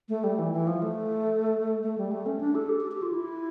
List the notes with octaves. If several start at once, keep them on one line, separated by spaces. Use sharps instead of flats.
A3
G3
E3
E3
F3
A3
A3
G3
A3
C#4
D4
A4
G4
G4
G4
F4
E4